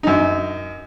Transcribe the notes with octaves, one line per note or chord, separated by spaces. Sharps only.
F#2 D#4